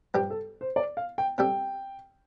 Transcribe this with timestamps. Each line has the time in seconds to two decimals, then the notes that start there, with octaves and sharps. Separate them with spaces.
0.14 G2 F3 D4 G4 G5
0.30 A4
0.61 C5
0.76 D5
0.97 F5
1.18 G5
1.38 C3 G3 D4 A4 G5